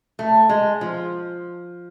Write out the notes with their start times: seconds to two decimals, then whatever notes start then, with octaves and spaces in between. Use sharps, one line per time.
0.19 A3
0.49 G#3
0.81 F3